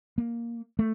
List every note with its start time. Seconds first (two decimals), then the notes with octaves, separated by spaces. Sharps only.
0.18 A#3
0.79 A3